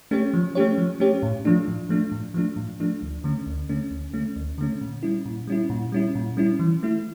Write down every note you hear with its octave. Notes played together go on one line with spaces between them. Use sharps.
A3 C#4 G4 C#5
F3
A3 C#4 G4 C#5
F3
A3 C#4 G4 C#5
A2
F3 A3 D4
A2
F3 A3 D4
A2
F3 A3 D4
A2
F3 A3 D4
D2
D3 A3 C#4
D2
D3 A3 C#4
D2
D3 A3 C#4
D2
D3 A3 C#4
A#2
G3 C#4 E4
A#2
G3 C#4 E4
A#2
G3 C#4 E4
A#2
G3 C#4 E4
E3
A3 E4